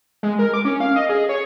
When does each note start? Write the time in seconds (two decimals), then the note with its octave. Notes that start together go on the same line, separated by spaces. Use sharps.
0.23 G#3
0.39 A#4
0.54 D6
0.65 C#4
0.80 F5
0.96 D#5
1.09 G#4
1.29 C#5